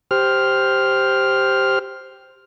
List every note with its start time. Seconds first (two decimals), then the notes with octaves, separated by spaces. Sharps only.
0.11 G4 C5 F6